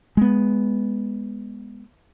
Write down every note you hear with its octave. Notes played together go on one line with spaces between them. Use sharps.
G#3 B3